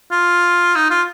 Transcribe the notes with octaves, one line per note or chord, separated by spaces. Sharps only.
F4
D#4
F4